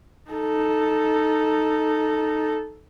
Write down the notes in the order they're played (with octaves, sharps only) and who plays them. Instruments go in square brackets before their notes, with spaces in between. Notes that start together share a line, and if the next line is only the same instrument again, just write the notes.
[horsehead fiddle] D#4 A4